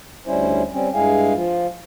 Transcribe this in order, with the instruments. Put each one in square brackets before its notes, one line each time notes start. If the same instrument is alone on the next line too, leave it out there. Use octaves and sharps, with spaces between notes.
[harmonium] D2 G3 C#4 E4 C5
G3 C4 C#4
G2 G#3 E4 G#4 F5 G#5
F3 F4